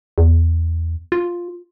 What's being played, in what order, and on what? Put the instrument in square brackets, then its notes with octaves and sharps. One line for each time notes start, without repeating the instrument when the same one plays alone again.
[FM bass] E2
F4